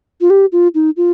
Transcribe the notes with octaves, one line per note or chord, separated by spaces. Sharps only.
F4
G4
F4
D#4
F4